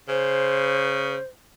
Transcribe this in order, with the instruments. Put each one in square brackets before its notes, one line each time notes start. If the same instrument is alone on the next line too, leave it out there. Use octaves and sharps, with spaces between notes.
[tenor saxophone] C#3 [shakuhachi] C5